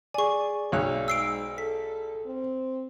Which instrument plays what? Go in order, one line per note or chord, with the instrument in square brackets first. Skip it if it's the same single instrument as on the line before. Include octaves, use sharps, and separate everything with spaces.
[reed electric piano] G#4 D5 [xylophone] G#5 C#6
[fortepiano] B1 C#5 F#6
[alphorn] G#2 [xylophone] E6 C7 D7
[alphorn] A4 [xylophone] B6
[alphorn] C4